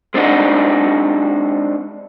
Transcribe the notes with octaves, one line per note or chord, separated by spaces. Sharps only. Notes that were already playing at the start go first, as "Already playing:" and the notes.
G#3 C4 D4 D#4 F#4